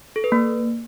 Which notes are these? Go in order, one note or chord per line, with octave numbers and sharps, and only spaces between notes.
A4
B4
A#3